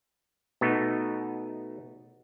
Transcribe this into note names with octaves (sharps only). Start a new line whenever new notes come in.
B2 A3 B3 D#4